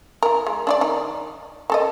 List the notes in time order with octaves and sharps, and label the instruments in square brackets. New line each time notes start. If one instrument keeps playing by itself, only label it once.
[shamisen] E3 A#4
G#3
D4 F4 D5
D#3 D#4
A#3 A4 D#5